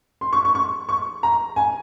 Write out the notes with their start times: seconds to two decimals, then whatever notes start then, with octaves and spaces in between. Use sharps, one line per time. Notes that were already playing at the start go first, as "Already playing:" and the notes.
0.21 C6
0.33 C#6
0.45 C#6
0.55 C#6
0.89 C#6
1.23 A#5
1.56 G#5